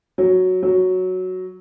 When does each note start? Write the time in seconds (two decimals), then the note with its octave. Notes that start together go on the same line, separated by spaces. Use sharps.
0.18 F#3
0.63 F#3